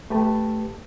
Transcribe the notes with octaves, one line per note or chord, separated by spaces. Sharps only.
A3 G4 B4 A5